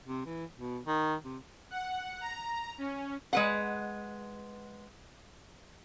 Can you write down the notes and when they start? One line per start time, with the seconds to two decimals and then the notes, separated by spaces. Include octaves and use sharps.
0.06 C3
0.26 E3
0.57 B2
0.87 D#3
1.24 C3
1.71 F#5
2.21 A#5
2.78 C#4
3.33 G#3 B4 F#5